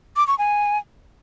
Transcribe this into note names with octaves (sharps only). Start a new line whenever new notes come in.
D6
C#6
G#5